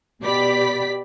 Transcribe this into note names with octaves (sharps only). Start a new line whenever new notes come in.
B2 G4 D5 B5 B6